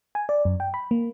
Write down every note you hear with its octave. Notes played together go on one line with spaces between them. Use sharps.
G#5
D5
F#2
G5
B5
A#3